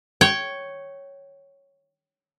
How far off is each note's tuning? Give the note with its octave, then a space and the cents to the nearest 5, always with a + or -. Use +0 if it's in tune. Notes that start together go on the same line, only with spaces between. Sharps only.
C#5 +0 G5 -20